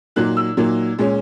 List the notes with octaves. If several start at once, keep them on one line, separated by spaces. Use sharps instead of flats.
A#2 F#3 A#3 D#4 F#6
E6
A#2 F#3 A#3 D#4
A#2 G#3 C#4